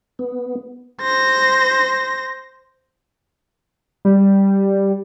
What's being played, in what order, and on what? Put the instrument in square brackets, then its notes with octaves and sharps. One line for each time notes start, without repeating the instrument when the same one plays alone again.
[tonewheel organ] B3
[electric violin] C5 A#6
[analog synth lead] G3